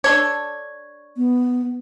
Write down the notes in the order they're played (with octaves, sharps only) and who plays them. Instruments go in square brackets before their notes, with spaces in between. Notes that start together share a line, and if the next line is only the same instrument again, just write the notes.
[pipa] D4 A4 C#5
[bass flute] B3